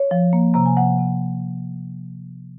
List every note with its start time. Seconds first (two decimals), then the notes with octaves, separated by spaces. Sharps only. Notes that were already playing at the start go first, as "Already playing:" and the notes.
Already playing: C#5
0.11 F3
0.33 A#3
0.54 C3 A#5
0.66 G#5
0.77 F3 F#5
0.99 C3